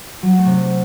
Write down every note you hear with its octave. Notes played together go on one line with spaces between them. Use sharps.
F#3
F#4
A3
C3